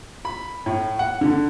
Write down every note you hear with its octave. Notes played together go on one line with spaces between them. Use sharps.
B5
A2
F#5
D3